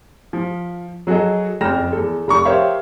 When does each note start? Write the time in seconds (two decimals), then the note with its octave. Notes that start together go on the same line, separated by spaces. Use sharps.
0.33 F3
1.07 F#3 F#4 G#4 A4 D#5
1.61 F#1 F2 G5 F6 A#6 E7
1.93 E2 A4
2.28 F1 A#5 C#6
2.45 G4 A#4 C5 C#5 E5 F5